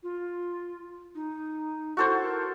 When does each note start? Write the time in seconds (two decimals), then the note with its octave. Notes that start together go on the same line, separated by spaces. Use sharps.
0.03 F4
1.15 D#4
1.97 E4 F#4 A4 C5
2.24 A#4